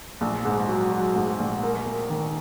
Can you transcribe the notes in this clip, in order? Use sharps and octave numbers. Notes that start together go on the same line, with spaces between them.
A#1
G#2
F#3
F#3
G#2
A#1
A#4
A#3
D#3